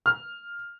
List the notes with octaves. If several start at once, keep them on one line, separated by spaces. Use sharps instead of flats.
F6